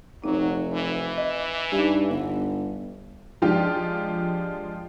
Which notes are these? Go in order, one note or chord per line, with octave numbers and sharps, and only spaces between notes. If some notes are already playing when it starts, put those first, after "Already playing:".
F1 F#3 D#4
E3
D#5
G2 D#4 G4
G1
F3 G#3 D4 F4 G4